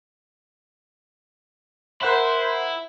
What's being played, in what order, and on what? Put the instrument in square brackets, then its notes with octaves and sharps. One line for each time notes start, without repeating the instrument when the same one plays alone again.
[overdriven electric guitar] E4 [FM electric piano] A#4 F#5 B5 [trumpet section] C5